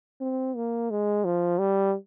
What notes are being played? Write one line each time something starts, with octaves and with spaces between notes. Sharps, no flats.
C4
A#3
G#3
F3
G3